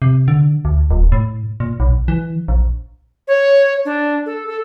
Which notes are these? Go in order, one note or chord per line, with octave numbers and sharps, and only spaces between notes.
C3
D3
D2
D#1
A2
A#2
B1
E3
A#1
C#5
D4
A4
A4